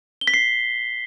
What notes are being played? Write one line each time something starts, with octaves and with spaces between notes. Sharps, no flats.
G7
B6
C7